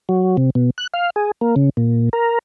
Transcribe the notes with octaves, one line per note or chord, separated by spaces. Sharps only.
F#3
C3
B2
F#6
F5
G#4
A#3
C#3
A#2
A#4